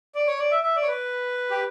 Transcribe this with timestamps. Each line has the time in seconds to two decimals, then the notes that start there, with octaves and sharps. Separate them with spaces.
0.15 D5
0.27 C#5
0.39 D5
0.51 E5
0.63 E5
0.76 D5
0.82 C#5
0.88 B4
1.51 G4